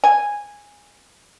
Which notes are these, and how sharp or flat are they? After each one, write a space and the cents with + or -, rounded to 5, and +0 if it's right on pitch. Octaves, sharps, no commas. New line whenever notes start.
G#5 -10